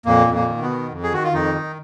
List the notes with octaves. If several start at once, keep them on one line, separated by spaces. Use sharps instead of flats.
F2 A#2 A#3
F2
A#2 A#3
D#3
B2 B3
D#3
F2
G#4
D#3 F#4
F4
F2 D#3 D#4
D#3